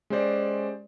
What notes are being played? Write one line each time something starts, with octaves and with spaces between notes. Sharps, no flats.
G#3 C#4 G4 C5 D5